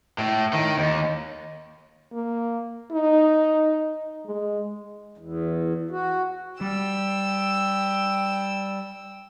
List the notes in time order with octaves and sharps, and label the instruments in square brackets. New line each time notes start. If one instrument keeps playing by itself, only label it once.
[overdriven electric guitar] A2
D#3
D#2
[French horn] A#3
D#4
G#3
[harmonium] E2
F#4
[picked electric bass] G3 [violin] G5 E6